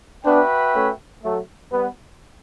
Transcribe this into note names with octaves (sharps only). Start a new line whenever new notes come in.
B3 D4 F#4 B4 E5 G5
A3 C#4
F#3 A3
G3 B3